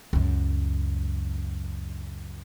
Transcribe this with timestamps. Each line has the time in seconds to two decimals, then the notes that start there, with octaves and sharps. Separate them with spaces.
0.13 C#2 F#2